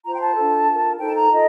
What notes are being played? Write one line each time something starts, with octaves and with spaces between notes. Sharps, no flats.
F4 C5 A#5
G5
A5
D4 F4 A4
F4 A#4
D#4 A4 C5 G5
A5
A#5
F4 A4 D#5